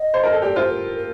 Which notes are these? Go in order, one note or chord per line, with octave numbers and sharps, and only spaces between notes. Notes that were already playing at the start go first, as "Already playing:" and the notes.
Already playing: D#5
C5
A#4
A4
G4 D5
F4 C5
A#4
A#4